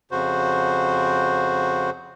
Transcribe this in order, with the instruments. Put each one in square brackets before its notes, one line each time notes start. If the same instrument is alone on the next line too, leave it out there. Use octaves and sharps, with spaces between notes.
[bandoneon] F2 C#3 F#4 C5